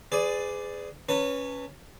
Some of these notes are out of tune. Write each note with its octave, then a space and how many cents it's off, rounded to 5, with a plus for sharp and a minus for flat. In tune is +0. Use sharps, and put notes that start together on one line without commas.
G#4 +0 B4 +40 D5 +0
C#4 +0 B4 +0 A5 +45